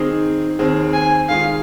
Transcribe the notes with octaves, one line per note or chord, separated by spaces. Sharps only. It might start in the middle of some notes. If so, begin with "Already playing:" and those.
Already playing: D#3 C4 D#4 G#4
D#2 D#3 C4 G#4
G#5
D#3 G#3 F4 G#4 F5